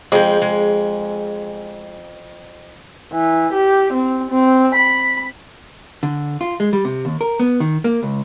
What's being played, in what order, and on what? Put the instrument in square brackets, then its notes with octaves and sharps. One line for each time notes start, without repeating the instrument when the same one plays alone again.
[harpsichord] F2 [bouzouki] G#3 G5
[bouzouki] G#3
[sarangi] E3
G4
C4
C4
B5
[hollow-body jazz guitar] D3
F4
G#3
G3
C3
D#2
A#4
B3
D#3
A#3
C#2